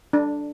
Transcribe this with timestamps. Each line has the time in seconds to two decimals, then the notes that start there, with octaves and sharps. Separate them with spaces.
0.13 D4